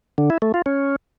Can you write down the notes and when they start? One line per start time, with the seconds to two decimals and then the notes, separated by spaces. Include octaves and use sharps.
0.18 D3
0.30 E4
0.42 A3
0.54 F4
0.66 C#4